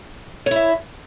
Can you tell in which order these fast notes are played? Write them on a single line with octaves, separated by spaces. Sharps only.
C#5 E4 E5